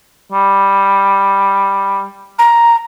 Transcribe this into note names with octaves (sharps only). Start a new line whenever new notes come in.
G3
A#5